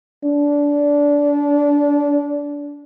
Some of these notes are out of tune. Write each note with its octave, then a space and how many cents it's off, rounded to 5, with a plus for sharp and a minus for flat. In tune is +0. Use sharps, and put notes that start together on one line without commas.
D4 -20